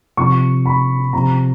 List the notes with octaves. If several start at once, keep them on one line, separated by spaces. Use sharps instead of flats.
C3 F3 C#6
B5
C3 F3 A#5